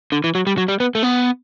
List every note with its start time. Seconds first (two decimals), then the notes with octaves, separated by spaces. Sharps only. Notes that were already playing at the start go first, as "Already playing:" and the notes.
0.12 D3
0.24 E3
0.35 F#3
0.47 G3
0.58 F#3
0.68 G3
0.80 B3
0.95 A3
1.03 B3